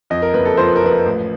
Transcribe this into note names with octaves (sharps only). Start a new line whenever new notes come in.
F2 D#5
A#4
F#1 B4
A4
F3 C5
B4
A#4
F3 B4
A1